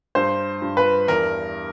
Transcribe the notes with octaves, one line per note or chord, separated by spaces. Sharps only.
G2 C5
G2
B4
E2 A#4